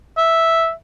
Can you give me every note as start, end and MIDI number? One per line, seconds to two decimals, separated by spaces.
0.17 0.71 76